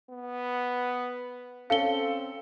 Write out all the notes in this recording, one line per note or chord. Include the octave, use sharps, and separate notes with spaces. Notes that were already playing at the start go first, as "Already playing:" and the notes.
B3
C4 C#4 A4 F5 C#7 G7